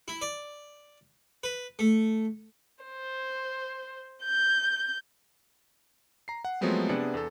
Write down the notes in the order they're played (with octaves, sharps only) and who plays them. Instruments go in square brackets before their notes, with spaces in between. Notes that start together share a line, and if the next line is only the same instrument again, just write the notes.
[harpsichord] E4
D5
B4
A3
[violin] C5
G6
[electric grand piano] A#5 C7
F#5
F3 F#3 G#3 A3 B3 C4
C3 B3 D4 G#4 D5 C#7
E2 A4